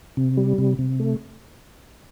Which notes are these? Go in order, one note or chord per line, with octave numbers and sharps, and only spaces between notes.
C3
G3
C3
C3
A3